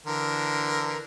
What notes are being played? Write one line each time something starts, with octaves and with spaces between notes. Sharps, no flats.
D3 E3 A#4